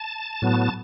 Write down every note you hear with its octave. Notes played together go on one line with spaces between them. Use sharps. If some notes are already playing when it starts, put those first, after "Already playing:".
Already playing: A5
A2 F#3 B3